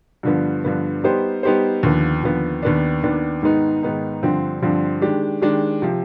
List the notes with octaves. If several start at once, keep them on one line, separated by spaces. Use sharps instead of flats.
G2 D3 F3 B3
G2 D3 F3 B3
G3 B3 D#4 G4 C5
G3 B3 D#4 G4 C5
D#2 D3 F3 B3
D#2 D3 F3 B3
D#2 D#3 B3 D4
D#2 D#3 B3 D4
G#2 D#3 B3 D#4
G#2 D#3 B3 D#4
G2 D3 F3 C4
G2 D3 F3 C4
D#3 G#3 D4 G4
D#3 G#3 D4 G4
C3 F3